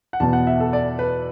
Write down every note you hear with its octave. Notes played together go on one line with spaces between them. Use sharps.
F#5
E2 B2 B3 A5
F#5
E5
A4
D5
B4